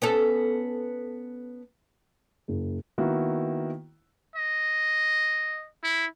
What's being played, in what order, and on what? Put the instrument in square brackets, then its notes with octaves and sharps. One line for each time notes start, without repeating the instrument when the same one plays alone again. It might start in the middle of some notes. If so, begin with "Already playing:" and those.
[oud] B3 C#4 A4
[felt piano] F#1
[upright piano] D#3 A#3 B3 E4 F#4
[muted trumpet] D#5
E4